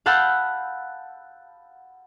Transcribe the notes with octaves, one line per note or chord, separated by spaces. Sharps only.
F5 F#5 A5 B5 E6 G6